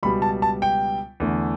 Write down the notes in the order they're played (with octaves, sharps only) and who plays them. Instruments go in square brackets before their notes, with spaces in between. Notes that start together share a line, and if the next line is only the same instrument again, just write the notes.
[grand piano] C#2 B2 G3 B3 B5
A5
A5
G5
E2 D3 A3